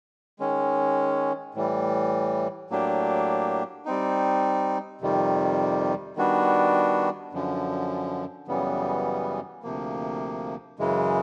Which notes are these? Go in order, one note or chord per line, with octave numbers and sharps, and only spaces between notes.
D#3 G#3 C#4
A2 E3 G3
A2 F#3 A#3 D4 G4
G3 C4 D#4
F2 C3 D#3 G3
D#3 G3 B3 D4 F#4
F#2 D3 F3
F#2 C#3 E3 G3 B3
D2 C3 F3 A#3
F#2 C#3 E3 G#3